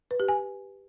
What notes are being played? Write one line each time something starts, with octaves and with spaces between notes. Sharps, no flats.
B4
G4
G#5